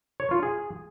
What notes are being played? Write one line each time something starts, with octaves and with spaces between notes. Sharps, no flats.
C#5
F4
G#4